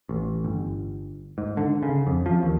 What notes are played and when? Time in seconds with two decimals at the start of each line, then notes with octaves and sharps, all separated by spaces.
0.09 A1
0.44 G1
1.38 G#2
1.57 D3
1.83 C#3
2.07 F2
2.26 F3
2.43 D#2